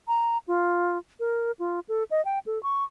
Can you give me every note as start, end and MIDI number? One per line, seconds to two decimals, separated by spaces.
0.08 0.38 82
0.48 0.98 65
1.20 1.52 70
1.59 1.80 65
1.89 2.04 69
2.11 2.24 75
2.25 2.39 79
2.46 2.61 69
2.63 2.84 85